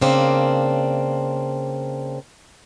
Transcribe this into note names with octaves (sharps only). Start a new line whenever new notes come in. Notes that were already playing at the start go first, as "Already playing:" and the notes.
C#3 A#3 C4 D4